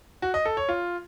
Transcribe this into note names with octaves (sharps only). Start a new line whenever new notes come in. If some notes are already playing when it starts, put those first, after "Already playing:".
F#4
D#5
A4
C#5
F4